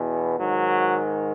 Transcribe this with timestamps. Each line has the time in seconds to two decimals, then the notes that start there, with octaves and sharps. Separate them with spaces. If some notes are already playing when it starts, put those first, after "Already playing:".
Already playing: E2 B2
0.37 G#2 D#3 F#3